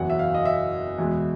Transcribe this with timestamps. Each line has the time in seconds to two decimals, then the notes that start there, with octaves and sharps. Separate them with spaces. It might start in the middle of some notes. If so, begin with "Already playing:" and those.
Already playing: F#1 E2 B2 F#3 F#5
0.10 E5
0.19 F5
0.34 D#5
0.45 E5
0.98 E2 B2 G#3